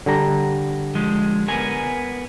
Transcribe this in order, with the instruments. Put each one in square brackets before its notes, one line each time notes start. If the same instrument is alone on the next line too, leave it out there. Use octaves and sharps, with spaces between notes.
[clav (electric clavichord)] D3 G3 A#5
[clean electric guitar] F3 G#3
B3 A#4 G#5